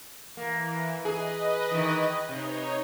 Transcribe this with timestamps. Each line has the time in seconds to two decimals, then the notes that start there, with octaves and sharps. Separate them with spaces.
0.37 E3 A#3
1.05 G#4 B4 D#5
1.71 D#3 E3
2.29 C3 D#4 C#5